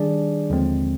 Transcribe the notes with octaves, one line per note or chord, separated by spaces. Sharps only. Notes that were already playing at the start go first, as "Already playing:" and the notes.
Already playing: D#3 G3 D4 G#4 D5
D#2 D3 F3 G#3 C4